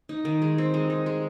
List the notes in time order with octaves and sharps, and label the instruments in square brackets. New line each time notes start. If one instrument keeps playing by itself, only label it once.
[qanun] D#4
D#3
G#3
C4
G#3
D#4
G#3